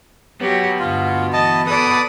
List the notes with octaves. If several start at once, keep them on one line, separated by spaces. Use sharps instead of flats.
F#3 B3 F#4 G4
D2 G2 F4
E3 D#5 A5
B2 A4 B4 D5 D#6